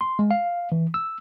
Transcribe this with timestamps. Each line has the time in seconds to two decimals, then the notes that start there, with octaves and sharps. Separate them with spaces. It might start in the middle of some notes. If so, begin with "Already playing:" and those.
0.01 C6
0.19 G#3
0.31 F5
0.72 E3
0.94 E6